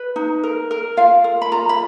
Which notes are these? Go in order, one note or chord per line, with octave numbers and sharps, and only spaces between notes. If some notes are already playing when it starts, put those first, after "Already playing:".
Already playing: B4
D#4
A#4
A#4
F4 F5
A#4
B5
F4 A#5
B5